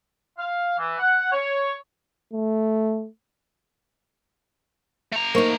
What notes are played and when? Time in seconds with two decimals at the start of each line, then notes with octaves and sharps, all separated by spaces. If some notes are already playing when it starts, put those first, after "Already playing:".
0.38 F5
0.78 E3
0.98 F#5
1.32 C#5
2.34 A3
5.13 A3 A#5
5.35 A#3 D#4 A#4 C5 C#6